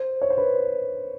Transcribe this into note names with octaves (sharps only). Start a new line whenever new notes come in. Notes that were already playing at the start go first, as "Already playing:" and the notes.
Already playing: C5
C#5
C5
B4